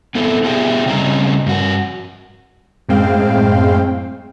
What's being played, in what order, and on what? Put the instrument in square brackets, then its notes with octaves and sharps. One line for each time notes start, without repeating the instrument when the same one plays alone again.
[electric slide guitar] B3 C4 E4 A4
B3 F4 G4 G#4 E5 G5
C#3 G3 C4 C#4 D#5 A#5
G2 F#4
[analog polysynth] F#2 A2 G#3 C4 F5 G5